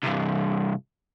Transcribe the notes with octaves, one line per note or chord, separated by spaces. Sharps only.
C2 G2